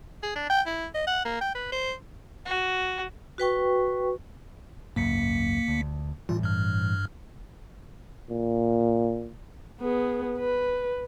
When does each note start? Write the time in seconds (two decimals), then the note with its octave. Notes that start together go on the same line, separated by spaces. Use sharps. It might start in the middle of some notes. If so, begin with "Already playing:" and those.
0.23 G#4
0.35 D4
0.50 G5
0.66 E4
0.94 D#5
1.07 F#5
1.25 A#3
1.41 G5
1.55 B4
1.72 C5
2.45 F#4
3.38 F#4 B4 G5 C#6
4.96 G#1 C#2 F#2 A#3 B6 C#7
5.68 D2
6.29 A2 E3 G3 F4
6.43 G2 F6
8.31 A#2
9.81 B3 G#4
10.38 B4